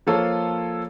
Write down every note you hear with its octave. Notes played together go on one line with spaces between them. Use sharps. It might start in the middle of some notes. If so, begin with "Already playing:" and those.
F3 A#3 F4 A4 C#5